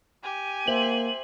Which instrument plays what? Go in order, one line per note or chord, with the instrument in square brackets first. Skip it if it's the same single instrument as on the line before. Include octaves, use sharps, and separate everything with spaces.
[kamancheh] G4 G#5
[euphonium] A#3 [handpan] C5 E5 [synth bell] F#7